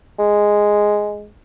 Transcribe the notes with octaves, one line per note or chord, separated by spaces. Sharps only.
G#3